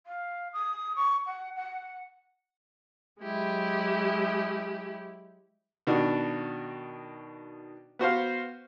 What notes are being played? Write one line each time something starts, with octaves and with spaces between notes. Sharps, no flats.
F5
D#6
C#6
F#5
F#5
F#3 G#3 E4 G4
B2 D#3 D4 F#4
B3 F#4 C5 F5